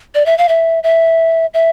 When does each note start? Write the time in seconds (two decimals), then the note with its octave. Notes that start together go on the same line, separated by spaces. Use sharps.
0.15 D5
0.26 E5
0.38 F5
0.49 E5
0.83 E5
1.54 E5